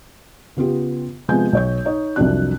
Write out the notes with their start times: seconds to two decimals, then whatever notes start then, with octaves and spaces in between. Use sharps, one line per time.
0.57 C#3 B3 F4 G4
1.28 C3 F3 G#3 B3 G#5 G6
1.53 B1 C#5 G6
1.85 D#4 C#5
2.16 C2 F2 F#3 D4 F#6